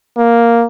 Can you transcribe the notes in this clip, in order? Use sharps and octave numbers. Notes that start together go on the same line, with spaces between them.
A#3